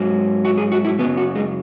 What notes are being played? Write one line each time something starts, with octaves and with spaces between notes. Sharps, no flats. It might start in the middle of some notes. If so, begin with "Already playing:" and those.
Already playing: G#2 F#3
F#4
G#4
F#4
E4
F#2 C#3 F#3 B3
F#4
G#3